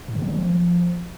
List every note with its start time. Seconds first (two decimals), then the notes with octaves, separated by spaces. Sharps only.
0.08 G#2
0.15 C#3
0.22 F#3
0.29 D#3
0.36 F3